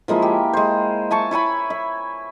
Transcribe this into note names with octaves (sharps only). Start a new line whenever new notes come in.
F3 G#3 A#3 E4
G4
G#3 C5
E5 G#5 A5 C#6
E4 C#5 G#5 B5
E5